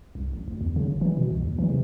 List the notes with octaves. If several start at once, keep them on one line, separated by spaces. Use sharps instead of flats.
C2
A1
D2
E2
C#3
F#1
E3
B2
C2
D#2
E3
C3